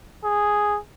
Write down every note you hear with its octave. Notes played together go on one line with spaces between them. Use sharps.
G#4